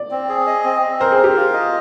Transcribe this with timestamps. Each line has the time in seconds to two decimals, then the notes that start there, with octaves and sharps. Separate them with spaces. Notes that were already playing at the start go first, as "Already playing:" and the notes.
Already playing: D5
0.11 C4
0.29 G#4
0.47 D#5
0.64 C4
0.82 C4
1.00 A#4 C5
1.12 G#4
1.18 A#4
1.24 G4
1.36 F4
1.53 D#5